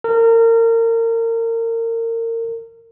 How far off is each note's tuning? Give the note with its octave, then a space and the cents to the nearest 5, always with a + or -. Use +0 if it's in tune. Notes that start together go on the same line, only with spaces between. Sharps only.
A#4 -30